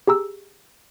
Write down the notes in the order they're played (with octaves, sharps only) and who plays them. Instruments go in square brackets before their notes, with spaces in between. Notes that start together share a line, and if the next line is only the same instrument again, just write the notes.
[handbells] G4 G#4 A#5 E6